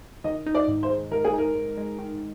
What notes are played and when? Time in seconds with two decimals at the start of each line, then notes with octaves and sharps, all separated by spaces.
0.24 D#3 D#5
0.46 D#4
0.55 D5
0.68 G#2
0.83 C5
0.90 G#3
1.11 D#3 A#4
1.24 G#4
1.33 D#4 A#4
1.55 G#2
1.77 G#3
1.99 D#3